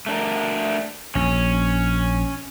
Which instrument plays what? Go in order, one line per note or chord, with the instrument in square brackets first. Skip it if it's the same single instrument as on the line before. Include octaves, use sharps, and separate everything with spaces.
[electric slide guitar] A3 D4 A#4
[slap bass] A#1 [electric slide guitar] C#4 C#5